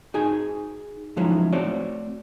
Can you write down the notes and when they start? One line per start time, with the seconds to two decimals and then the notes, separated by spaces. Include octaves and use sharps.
0.14 D#4 F#4 G#4 G#5
1.17 F3 F#3 G#3 C#4 D#4 E4
1.52 A3 C4 F#4 C#5 D5